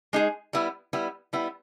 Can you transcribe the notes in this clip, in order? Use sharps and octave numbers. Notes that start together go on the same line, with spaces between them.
G#3 D#4 G#4
G3 B3 E4
G3 B3 E4
G3 B3 E4